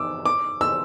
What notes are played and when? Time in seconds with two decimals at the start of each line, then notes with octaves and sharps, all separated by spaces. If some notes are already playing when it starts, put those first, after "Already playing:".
Already playing: D6 E6
0.25 D6
0.61 E6